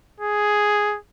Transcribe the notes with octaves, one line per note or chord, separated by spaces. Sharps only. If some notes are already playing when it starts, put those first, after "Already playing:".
G#4